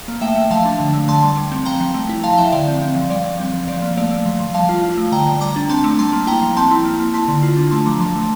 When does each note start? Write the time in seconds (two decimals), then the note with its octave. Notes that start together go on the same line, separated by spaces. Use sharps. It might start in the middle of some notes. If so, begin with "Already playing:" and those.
Already playing: F5
0.08 A#3
0.21 A3 E5 G5
0.36 A3
0.51 F3 F5 A5
0.65 D4
0.80 D3
0.93 A3
1.08 D3 A5 C6
1.23 G3
1.37 G3
1.52 C4
1.65 F3 G5 A#5
1.80 F3
1.94 A3
2.09 E4
2.23 F3 F5 A5
2.38 F3 E5 G5
2.52 D3 D5 F5
2.68 C4
2.82 C4
2.96 F3
3.10 G3 D5 F5
3.25 G3
3.40 C4
3.54 F3
3.67 F3 D5 F5
3.82 A#3
3.97 A3 D5 F5
4.11 A3
4.26 F3
4.40 F3
4.54 G3 F5 A5
4.69 F4
4.83 F4
4.97 A3
5.12 D3 G5 A#5
5.26 D3
5.41 G3 A#5 D6
5.56 D4
5.69 C4 A5 C6
5.84 A3
5.99 G3 A5 C6
6.13 A#3
6.27 E4 G5 A#5
6.42 F3
6.57 C4 A5 C6
6.71 E4
6.85 A#3
7.00 A#3
7.14 E4 A5 C6
7.28 D3
7.43 F4
7.57 D4
7.71 A3 A5 C6
7.86 F3 A#5 D6
8.00 F3 A5 C6
8.15 A3